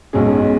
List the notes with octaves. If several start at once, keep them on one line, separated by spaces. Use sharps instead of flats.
B1 B2 G#3 C#4 G#4